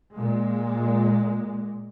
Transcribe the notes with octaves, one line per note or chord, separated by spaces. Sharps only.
A#2 G#3